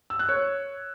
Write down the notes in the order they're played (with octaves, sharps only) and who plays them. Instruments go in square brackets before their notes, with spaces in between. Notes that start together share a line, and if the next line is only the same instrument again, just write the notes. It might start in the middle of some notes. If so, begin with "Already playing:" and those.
[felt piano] E6
F#6
C#5